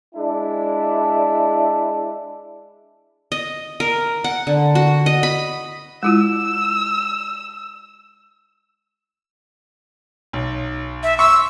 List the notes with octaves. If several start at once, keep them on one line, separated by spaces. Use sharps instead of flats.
G#3 D4 E4
D#5
A#4
F#5
D3
F#4
D#5
B5
G#3 E4 F4 E6
B1
E5
C6 C#6 E6